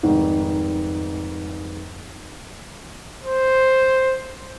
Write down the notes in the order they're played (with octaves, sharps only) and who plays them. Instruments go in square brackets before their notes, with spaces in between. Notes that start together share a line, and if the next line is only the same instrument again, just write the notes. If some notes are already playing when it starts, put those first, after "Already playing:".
[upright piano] F1 G#2 D#3
[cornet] C5